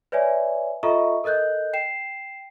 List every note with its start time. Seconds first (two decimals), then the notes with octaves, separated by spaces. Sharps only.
0.12 B4 C#5 D5 E5 G#5
0.83 F4 A4 D#5 E5 A#5 C#6
1.24 A4 A#4 D#5 F#6 G6
1.73 G5 C7 E7